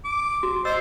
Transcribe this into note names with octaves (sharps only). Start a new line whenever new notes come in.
D6
F#4
C5 D#5 E6